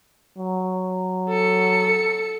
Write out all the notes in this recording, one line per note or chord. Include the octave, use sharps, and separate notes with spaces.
F#3
A4 C#7